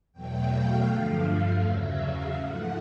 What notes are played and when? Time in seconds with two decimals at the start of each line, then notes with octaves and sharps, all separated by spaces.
0.13 E2 B2 F#3 A3 G5
0.50 F5
0.87 G2 D3 F3 A3
1.59 E2 C#3 F#3 E5
1.96 F5
2.33 G#2 F3 A3 F#5